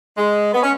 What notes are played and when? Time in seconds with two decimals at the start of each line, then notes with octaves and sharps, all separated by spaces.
0.18 G#3
0.54 B3
0.63 C#4